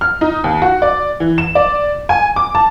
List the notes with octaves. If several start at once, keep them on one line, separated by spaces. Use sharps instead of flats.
F6
D#4
D#2
F#4
D5
E3
E7
D5
G#5
D6
A5